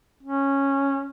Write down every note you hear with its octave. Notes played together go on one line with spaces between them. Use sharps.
C#4